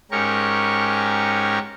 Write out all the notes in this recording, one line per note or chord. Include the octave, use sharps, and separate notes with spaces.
G#2 C#4 G4 A#4 C#6